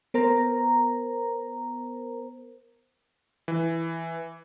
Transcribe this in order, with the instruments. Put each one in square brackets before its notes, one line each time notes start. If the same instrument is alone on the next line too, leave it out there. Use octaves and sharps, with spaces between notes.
[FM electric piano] B3 A#4 C5 A#5
[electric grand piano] E3